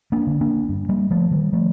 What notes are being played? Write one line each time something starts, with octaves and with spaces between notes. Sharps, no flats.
A#3 D4
D3
A#3 D4
G2
G3 A#3
D3 F3 A3
D#3 G3
F3 A3